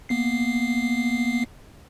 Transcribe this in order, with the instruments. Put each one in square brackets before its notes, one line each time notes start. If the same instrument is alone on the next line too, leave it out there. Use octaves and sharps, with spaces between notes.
[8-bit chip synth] A#3 B3 C7